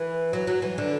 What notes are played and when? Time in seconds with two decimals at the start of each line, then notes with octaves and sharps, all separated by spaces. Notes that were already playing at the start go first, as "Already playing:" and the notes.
Already playing: E3
0.33 F#3
0.47 F#3
0.62 E3
0.78 D3